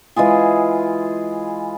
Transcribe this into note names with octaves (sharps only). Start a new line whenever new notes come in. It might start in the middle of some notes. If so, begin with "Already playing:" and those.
E3 G#3 F4 G#4